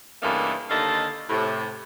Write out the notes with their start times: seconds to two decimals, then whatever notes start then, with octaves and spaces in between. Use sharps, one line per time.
0.22 G2 C#3 E3 A3 A#3 D#4
0.70 D#2 D3 D#4 A4 D#5 F5
1.29 A2 C3